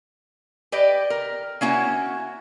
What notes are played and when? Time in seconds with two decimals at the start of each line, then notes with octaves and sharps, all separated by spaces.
0.72 G4 B4 D5 D#5
1.10 A#4
1.61 A#3 C#4 E4 F#4